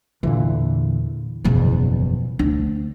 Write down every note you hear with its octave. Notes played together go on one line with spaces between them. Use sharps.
E2 A#2 D3 E3
F#1 E2 B2 F3
D2 D4